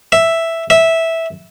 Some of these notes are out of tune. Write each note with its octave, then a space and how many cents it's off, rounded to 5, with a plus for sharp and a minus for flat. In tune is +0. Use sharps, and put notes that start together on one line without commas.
E5 +0
E5 -10